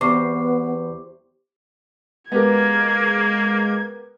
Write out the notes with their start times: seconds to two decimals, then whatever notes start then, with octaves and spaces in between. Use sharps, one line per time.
0.01 E2 B3 G4 C5 C#6 D6 C7
2.32 G#3 A#3 B3 G4 A#4 G#6